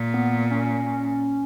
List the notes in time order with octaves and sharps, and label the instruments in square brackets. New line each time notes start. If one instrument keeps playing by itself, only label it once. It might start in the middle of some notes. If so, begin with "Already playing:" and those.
Already playing: [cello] A#2
[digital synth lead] B3
C#4
C#4